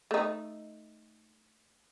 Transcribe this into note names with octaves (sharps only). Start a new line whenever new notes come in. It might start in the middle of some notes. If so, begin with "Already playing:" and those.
A3 D#4